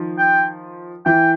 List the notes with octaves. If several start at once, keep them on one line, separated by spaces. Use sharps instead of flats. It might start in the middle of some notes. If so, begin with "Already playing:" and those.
Already playing: D#3 F3
G5
E3 G5